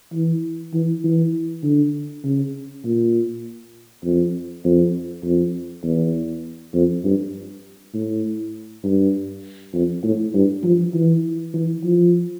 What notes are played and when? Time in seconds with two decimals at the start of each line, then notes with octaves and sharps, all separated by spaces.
0.13 E3
0.74 E3
1.04 E3
1.63 D3
2.24 C#3
2.85 A#2
4.04 F2
4.65 F2
5.24 F2
5.84 E2
6.74 F2
7.05 G2
7.94 A2
8.84 G2
9.74 F2
10.04 A2
10.35 G2
10.64 F3
10.94 E3
11.54 E3
11.84 F3